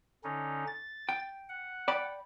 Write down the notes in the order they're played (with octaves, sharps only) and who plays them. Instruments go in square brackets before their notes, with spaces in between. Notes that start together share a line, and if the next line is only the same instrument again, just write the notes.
[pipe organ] D3 C#4 D#4
A6
[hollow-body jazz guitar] G5
[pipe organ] F#5
[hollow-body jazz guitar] D5 G5 B5